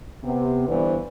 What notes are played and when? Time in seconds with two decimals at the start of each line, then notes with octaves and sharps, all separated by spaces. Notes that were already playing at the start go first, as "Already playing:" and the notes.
0.24 C3 B3
0.68 G2 D3 E3 B3 C5 D5